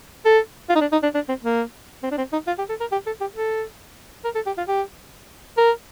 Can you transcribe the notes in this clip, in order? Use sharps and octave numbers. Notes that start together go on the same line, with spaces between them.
A4
F4
D#4
D4
D#4
D4
D4
C4
A#3
C4
D4
C4
D#4
F4
G4
A4
A#4
G4
A4
G4
A4
A#4
A4
G4
F4
G4
A#4